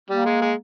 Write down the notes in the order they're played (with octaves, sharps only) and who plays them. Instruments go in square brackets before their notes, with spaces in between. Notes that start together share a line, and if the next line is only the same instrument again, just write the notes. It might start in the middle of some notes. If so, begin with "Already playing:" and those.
[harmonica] G3 [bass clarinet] A#3
[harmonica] G#3
G#3